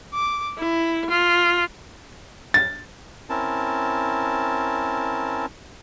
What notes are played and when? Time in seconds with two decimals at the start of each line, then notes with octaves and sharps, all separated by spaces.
0.15 D6
0.58 E4
1.10 F4
2.54 A6
3.30 C4 C#4 E4 A#4 A5